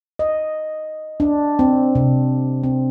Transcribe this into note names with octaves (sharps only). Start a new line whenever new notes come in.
D#5
D4
C4
C3
C4